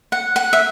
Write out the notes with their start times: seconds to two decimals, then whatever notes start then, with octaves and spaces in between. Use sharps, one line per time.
0.12 F#5
0.36 F#5
0.53 E5